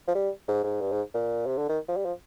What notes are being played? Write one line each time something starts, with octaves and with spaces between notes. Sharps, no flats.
F3
G3
G#2
G#2
G2
G#2
A#2
C3
D3
D#3
F3
G3
F3